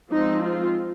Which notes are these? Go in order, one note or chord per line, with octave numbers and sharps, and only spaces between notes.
F3 G#3 C4 D#4
F4